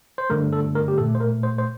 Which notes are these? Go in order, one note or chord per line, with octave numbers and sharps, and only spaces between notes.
C5
G2 D3 A3 A#4
A4
A#4
G4
A#2 A3 A4
C5
A#4
C5
C5